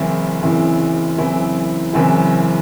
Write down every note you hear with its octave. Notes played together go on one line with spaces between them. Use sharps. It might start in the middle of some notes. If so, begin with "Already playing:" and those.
Already playing: F#1 F#2 E3 C4 E4
F#1 F#2 E3 C4 E4
F#1 F#2 E3 C4 E4
F#1 F#2 E3 C4 E4